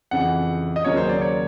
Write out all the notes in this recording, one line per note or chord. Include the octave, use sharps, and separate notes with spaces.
F2 C#3 E3 F#5
D#5
D#2 C#3 F#3 A#3 C#5
C5
D5
C#5